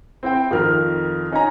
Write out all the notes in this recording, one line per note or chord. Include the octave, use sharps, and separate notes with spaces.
C4 E4 C5 G5
F2 D#3 F3 A#4 F6
C#4 D#4 D#5 G#5 A#5